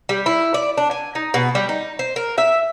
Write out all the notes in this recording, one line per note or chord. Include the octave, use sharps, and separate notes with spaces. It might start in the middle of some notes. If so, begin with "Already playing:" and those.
G3
E4
D5
D4
G#5
D#4
B2
G3
D#4
C5
A#4
E5